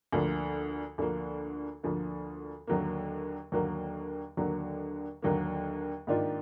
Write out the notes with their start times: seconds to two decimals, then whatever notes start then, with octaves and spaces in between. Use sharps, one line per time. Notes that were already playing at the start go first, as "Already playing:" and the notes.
0.12 D2 D3 F3 A#3
0.98 D2 D3 F3 A#3
1.83 D2 D3 F3 A#3
2.67 D#2 D3 F#3 A#3
3.52 D#2 D3 F#3 A#3
4.37 D#2 D3 F#3 A#3
5.22 D#2 D3 F#3 A#3
6.07 G#2 D#3 A#3 D4 F4